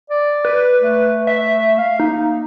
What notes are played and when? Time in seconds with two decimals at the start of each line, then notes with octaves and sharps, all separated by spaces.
0.10 D5
0.45 B4
0.81 A3
1.27 E5
1.78 F5
2.00 A#3 D#4